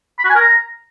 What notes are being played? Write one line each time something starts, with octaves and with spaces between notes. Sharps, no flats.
B5
F#4
G#5
A#4
A#5